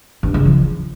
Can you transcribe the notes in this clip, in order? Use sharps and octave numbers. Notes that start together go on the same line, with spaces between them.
G2
C#3
F3